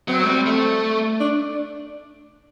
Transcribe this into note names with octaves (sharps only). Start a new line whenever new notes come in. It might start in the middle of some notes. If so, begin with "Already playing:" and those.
F#3 C4
A3
G3
A3
D4